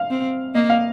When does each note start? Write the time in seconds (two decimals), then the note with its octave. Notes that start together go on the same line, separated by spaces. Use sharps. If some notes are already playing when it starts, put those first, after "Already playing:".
Already playing: F5
0.10 C4
0.55 A#3 D#5
0.70 F5